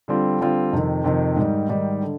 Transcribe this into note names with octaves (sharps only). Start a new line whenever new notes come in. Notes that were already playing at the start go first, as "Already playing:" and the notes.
D3 G3 C4 F4
D3 G3 C4 F4
F2 C3 D#3
F2 C3 D#3
G#2 D#3 G3
G#2 D#3 G3
D3